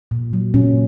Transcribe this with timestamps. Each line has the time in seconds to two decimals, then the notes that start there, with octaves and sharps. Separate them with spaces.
0.11 A#2
0.33 F#3
0.54 A#2 C#4